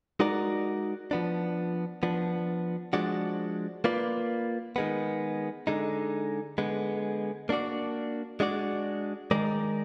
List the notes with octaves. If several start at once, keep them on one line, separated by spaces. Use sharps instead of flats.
G#3 D#4 F#4 A#4 D5
F3 B3 D4
F3 B3 D4
F3 G#3 D4 F#4 D5
A#3 F4 B4 D5
D#3 G#3 B3
D3 G#3 D#4
D3 G#3 B3
A#3 D4 F#4 D5
G#3 D4 F#4 D5
D#3 G#3 D#4 A#4 D5